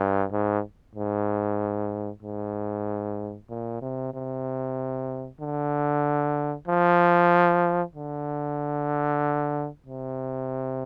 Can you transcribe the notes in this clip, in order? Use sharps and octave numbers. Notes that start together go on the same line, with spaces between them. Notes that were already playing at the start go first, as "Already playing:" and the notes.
Already playing: G2
G#2
G#2
G#2
A#2
C3
C3
D3
F3
D3
C3